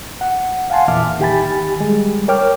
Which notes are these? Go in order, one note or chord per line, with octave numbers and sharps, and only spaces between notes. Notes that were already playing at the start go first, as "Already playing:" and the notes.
F#5
F5 F#5 G#5 A5 C6
E2 A#2 E3 E5 D6 F6
D#3 G4 G5 G#5 B5 A6
G3 G#3
A#4 C#5 G5 D6 F6